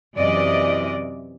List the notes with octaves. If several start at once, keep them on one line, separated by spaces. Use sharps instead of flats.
F#2 C3 E3 D5 D#5